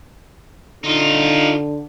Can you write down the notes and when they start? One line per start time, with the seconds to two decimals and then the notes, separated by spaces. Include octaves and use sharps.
0.83 D3 D#4 F4